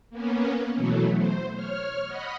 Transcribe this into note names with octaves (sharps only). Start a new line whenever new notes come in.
A#3 B3 C#4
B2 E3 F#3 A3
C5
C#5 F6
D#5 F#5 B5